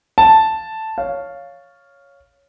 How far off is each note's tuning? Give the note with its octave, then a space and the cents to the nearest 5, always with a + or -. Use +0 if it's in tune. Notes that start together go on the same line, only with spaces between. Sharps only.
F5 +0 A5 +0
C#5 +5 F5 +0